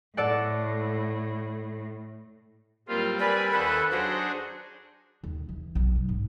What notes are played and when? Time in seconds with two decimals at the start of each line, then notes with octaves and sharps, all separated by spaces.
0.17 A2 A4 D5 F#5
2.88 A2 F#3 G3 A#3 C4 F4
3.20 A#4 B4 D5 G#5 B5
3.52 D#2 A4 B4 C5 F#5
3.91 F#3 D4 D#4 F#4 G#4 C5
5.23 D#2
5.49 E3
5.75 B1
5.95 F#3
6.09 G#2